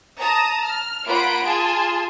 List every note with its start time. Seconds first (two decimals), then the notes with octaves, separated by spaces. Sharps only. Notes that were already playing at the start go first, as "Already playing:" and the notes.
0.20 A5 A#5 D#6
0.65 F6
1.06 A#3 F4 F#5 B5 D7
1.44 F4 G#4 G#5 A5